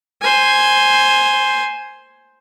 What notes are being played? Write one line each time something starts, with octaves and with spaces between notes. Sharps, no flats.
C5 G#5